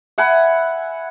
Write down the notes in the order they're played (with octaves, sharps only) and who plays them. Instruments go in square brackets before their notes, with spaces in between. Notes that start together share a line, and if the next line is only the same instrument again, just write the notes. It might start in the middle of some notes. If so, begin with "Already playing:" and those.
[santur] E5 F#5 G#5 B5